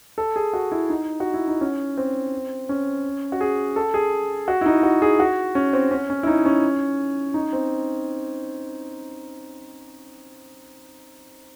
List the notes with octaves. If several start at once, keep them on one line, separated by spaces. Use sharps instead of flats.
A4
G#4
F#4
E4
D#4
F#4
E4
D#4
C#4
C4
C#4
F#4
G#4
A4
G#4
F#4
E4
D#4
F#4
G#4
F#4
C#4
C4
C#4
C#4
E4
D#4
C#4
D#4
C4